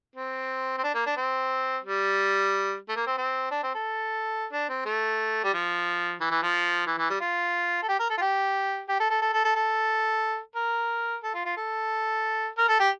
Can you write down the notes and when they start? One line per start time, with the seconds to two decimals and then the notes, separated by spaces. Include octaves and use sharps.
0.16 C4
0.78 C4
0.83 D4
0.94 A#3
1.06 D4
1.17 C4
1.84 G3
2.89 A3
2.96 A#3
3.06 C4
3.18 C4
3.51 D4
3.63 C4
3.75 A4
4.52 D4
4.69 C4
4.86 A3
5.44 G3
5.53 F3
6.20 E3
6.31 E3
6.43 F3
6.86 E3
6.98 E3
7.10 G3
7.21 F4
7.83 A4
7.88 G4
7.99 A#4
8.10 A4
8.18 F4
8.21 G4
8.89 G4
9.00 A4
9.10 A4
9.22 A4
9.33 A4
9.44 A4
9.55 A4
10.55 A#4
11.23 A4
11.34 F4
11.45 F4
11.57 A4
12.58 A#4
12.68 A4
12.80 G4